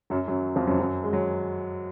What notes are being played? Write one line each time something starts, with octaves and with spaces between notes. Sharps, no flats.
F#2 F#3
F#2 F#3
F2 F3
F#2 F#3
F#2 F#3
G#3
F#3